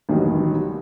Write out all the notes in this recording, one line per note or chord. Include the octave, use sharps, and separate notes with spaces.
A1 B2 D#3 F#3 G3